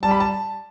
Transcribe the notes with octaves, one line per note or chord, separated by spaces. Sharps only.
G3 A5
B5
A5